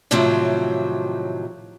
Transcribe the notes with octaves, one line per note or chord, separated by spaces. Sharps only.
A2 C3 D#3 F3 F#3